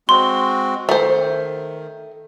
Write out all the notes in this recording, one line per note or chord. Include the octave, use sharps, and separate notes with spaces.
G#3 C4 F#4 C6
D#3 A3 C5